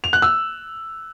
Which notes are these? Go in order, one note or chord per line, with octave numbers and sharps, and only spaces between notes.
F7
F#6
E6